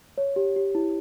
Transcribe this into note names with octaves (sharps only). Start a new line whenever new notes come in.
C#5
G4
G4
E4